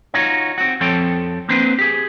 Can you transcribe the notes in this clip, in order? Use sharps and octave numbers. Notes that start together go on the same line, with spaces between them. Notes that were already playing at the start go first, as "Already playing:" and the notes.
D#4 F4 F#4 C#5
C4 F#4
F2 F3 C4 A4 C#5 G5
A#3 C4 D4 B4 C5
G4 G#4